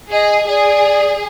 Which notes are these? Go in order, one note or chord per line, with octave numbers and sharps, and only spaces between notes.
G#4 D#5
G#4 D5